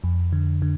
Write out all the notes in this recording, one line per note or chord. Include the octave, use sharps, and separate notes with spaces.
F2
D3
D3